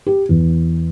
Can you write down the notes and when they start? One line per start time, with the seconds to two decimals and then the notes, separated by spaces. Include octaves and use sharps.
0.06 G4
0.29 E2